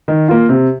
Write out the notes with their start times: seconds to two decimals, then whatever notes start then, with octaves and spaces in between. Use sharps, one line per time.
0.08 D#3
0.28 A#3 F4
0.49 C3